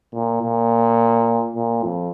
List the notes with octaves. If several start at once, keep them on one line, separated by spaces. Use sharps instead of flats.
A#2
A#2
A#2
F2